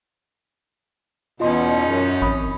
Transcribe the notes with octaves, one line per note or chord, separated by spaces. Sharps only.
E2 B2 C#4 D#4 F4 D#5 C6
F#2
A1 C4 B5 D#6